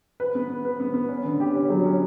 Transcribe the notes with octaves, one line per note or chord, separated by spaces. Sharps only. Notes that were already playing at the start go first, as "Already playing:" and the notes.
B4
B3
B3
B4
B3
B3
C#4
D3
G4
C#4
F#3
C#4